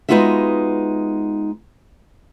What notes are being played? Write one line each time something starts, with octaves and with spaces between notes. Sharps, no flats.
G#3 B3 D#4 F4 F#4 E5